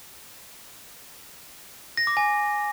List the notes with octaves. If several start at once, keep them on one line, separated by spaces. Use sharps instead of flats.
A#6
D6
G#5